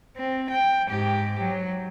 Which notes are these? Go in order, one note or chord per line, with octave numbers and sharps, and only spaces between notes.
C4
G5
G#2 G4
F#3